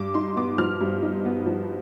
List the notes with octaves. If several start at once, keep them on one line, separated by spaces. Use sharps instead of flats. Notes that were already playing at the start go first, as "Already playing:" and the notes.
Already playing: G2 D6
D#4 C6
B3 D6
F3 F6
G2
D#4
B3
F3